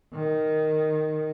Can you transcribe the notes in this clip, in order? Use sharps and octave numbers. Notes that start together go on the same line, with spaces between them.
D#3